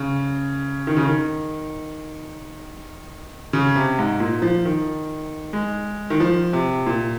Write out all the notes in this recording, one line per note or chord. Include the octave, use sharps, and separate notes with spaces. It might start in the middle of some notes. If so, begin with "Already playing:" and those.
Already playing: C#3
D#3
C#3
D#3
C#3
C3
G#2
A#2
F3
D#3
G#3
D#3
F3
C3
A#2